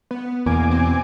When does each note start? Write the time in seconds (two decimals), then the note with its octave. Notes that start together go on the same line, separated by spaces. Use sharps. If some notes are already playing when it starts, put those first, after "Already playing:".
0.11 B3
0.46 E2 B2 A#3 G#5 D6
0.71 C4